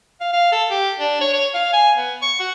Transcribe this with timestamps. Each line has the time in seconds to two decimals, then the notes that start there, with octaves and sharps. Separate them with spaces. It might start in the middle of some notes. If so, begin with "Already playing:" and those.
0.21 F5
0.33 F5
0.52 A4
0.70 G4
0.99 D4
1.21 C#5
1.33 C#5
1.54 F5
1.73 G#5
1.97 B3
2.22 C#6
2.40 F#4